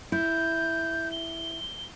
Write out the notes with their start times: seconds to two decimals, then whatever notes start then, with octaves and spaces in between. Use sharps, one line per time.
0.12 E4 G6
1.12 G7